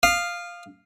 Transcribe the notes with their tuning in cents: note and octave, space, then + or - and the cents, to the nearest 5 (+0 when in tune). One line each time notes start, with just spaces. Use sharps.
F5 +0 D#6 -30